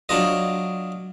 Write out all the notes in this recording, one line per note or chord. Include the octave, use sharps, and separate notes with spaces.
F#3 D4 F4 D#5